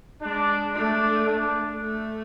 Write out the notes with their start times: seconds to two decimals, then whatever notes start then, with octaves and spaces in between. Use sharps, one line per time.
0.22 G#3 D4
0.75 A3 D4
1.27 D4
1.81 A3